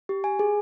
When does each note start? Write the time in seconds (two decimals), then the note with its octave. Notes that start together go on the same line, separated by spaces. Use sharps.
0.09 G4
0.24 G#5
0.39 G#4